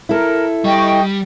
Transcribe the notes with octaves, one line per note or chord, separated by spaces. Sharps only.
E4 A4 A#4
G3 D#5 G5 C#6